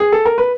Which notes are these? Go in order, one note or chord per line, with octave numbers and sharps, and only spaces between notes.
G#4
A4
A#4
B4